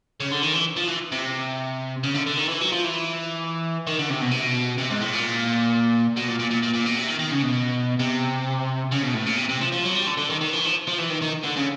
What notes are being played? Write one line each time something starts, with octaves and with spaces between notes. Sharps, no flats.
C#3
D3
D#3
E3
F3
E3
C3
C#3
D3
D3
D#3
E3
F#3
F3
E3
D#3
D3
C3
B2
C3
B2
C3
G#2
A2
A#2
B2
A#2
A#2
A#2
A#2
A#2
B2
C3
D#3
D#3
C#3
B2
C3
C#3
B2
A2
A#2
C3
C3
F3
F3
F#3
G3
D3
D3
D#3
D#3
E3
F3
F3
E3
D#3
D#3
D3
C#3